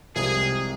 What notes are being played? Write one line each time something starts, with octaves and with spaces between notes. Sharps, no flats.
C2 C3 F3 G#3 G#4